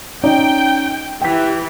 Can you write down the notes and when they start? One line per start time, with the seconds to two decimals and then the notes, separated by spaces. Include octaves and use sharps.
0.24 C#4 D#4 D5 G5
1.22 E3 G4 G5 B6